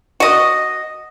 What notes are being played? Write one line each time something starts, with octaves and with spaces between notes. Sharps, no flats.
F#4 D#5